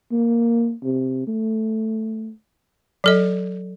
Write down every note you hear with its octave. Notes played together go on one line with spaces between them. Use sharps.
A#3
C3
A3
F#3 A4 D#5